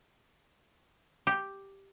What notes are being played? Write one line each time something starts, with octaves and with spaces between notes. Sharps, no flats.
G4